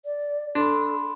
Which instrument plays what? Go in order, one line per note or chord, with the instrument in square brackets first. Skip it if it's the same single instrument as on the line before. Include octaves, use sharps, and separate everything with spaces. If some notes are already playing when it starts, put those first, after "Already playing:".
[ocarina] D5
[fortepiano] D4 [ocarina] A4 [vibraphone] B5 C6